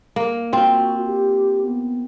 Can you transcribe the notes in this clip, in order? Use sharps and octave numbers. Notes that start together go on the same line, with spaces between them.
A#3
C4 F4 F#4
G4
B3